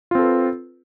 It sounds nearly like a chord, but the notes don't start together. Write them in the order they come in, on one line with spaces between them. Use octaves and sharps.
F4 C4 A4 B4